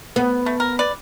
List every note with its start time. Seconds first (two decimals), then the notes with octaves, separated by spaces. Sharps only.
0.16 B3
0.46 A3
0.60 A#4
0.79 B4 D5